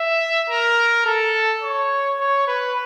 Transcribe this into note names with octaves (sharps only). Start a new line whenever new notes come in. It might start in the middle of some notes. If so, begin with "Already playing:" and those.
Already playing: E5
A#4
A4
C#5
C#5
B4